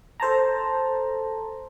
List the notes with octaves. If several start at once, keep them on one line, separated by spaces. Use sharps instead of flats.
A4 C5 A5 A#5